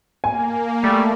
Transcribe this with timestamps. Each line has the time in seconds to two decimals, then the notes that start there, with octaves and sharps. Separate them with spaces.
0.24 A#3 G#5
0.84 G3 A3